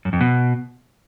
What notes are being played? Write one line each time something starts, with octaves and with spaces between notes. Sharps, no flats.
F#2
F2
B2